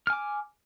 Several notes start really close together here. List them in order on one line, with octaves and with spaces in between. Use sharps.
F6 G#5 D6